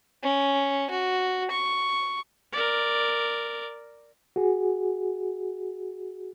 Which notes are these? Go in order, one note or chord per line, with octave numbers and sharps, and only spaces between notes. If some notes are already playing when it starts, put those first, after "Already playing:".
C#4
F#4
C#6
A#4 D5
F#4 G#4